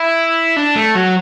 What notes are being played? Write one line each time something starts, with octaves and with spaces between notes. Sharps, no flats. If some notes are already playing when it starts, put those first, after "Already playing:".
Already playing: E4
D4
A3
F#3